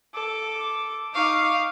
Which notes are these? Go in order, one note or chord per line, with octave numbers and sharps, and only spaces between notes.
A4 D6
D#4 F5 C#6 D6